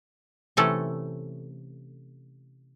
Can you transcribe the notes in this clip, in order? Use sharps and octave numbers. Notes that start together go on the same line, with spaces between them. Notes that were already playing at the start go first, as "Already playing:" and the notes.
C3 E3 A3 C#4 A4